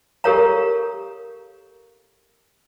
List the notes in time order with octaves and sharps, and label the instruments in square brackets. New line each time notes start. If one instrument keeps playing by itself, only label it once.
[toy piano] G4 A4 A#4 C#5 F5 A#5